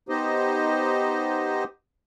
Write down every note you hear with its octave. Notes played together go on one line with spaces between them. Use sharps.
B3 D#4 G4 C5 D#5